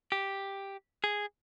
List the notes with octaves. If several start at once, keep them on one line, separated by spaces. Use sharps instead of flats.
G4
G#4